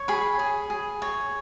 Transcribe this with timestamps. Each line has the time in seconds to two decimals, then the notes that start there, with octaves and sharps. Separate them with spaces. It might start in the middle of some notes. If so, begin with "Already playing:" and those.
Already playing: C#5
0.08 G#4 B5
0.39 G#4
0.70 G#4
1.02 C#5